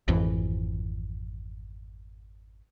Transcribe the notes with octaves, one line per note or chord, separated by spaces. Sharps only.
G#1 F2 E3